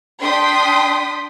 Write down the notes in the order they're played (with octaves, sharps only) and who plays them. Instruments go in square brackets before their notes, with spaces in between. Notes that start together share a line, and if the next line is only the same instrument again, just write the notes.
[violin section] D4 G5 C6 D#6 B6